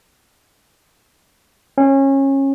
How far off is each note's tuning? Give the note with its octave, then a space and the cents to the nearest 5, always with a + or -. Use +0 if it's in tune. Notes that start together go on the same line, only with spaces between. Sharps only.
C#4 -25